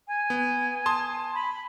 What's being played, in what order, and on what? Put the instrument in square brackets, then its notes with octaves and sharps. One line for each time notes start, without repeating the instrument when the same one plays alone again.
[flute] G#5
[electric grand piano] B3
A5 C6 D#6
[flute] B5